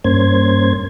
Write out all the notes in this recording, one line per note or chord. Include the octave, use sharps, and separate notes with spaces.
G2 A#3 C#4 C5 G#6